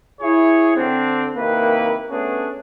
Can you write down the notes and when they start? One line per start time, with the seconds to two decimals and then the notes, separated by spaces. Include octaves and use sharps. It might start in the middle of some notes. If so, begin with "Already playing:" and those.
0.21 E4 G#4 C#5
0.75 D3 C4 D4
1.36 C3 D#3 A#3 E4 B4
2.09 A3 B3 C#4 D4 F#4 G#4